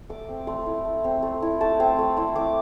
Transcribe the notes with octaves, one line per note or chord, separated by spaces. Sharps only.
A3 D6
C4
A3 C6
E4
A3
C4
A3
E4
A3 A5
C4 G5
A3
E4 C6
A3 D6